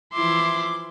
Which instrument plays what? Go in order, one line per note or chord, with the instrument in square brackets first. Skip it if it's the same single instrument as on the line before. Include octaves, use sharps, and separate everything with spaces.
[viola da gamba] E3 F3 E4 [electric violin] C6 [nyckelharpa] D6